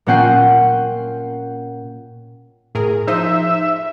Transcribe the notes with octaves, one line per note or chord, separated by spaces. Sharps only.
A#2 A#3 C#4 F#5 G5 C7
A2 G#4 A#4
F3 D#4 C5 E5